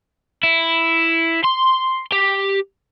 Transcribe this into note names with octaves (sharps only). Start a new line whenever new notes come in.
E4
C6
G4